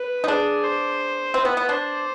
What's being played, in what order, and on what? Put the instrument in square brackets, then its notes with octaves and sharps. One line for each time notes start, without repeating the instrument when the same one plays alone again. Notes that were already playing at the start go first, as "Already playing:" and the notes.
Already playing: [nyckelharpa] B4
[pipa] D#4
[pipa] D4 [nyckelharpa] G#4
[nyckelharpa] C5
[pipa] C4 [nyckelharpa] B4
[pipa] B3
B3
[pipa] D4 [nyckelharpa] C5